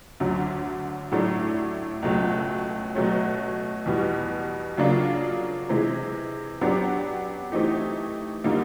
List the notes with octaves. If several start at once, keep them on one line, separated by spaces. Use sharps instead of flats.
D2 D3 F#3
A2 F#3 A3 D4
C#2 B2 F#3 A3
B2 F#3 A3 C#4
E2 B2 G3
C#3 F#3 A#3 D4 F4
C3 E3 G#3
F#3 B3 D4 G4
E3 A3 C4 D#4 G4
D3 G3 A#3 D#4